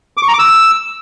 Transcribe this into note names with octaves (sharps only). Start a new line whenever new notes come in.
D6
C#6
A#5
D6
E6